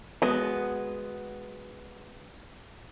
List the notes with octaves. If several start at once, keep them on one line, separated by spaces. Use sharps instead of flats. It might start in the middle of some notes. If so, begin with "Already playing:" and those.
G#3 B3 F#4